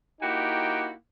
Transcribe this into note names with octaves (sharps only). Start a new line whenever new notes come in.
A#3 D#4 E4 F#4 G4 G5